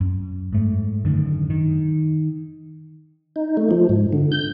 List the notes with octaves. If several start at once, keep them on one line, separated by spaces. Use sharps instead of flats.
F#2
G#2 A3
F#2 D3 D#3
D#3
D#4
A3
F3
G#2
D3
G6